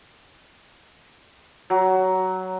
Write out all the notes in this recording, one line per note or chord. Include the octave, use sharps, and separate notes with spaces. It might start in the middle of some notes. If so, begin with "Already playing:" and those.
F#3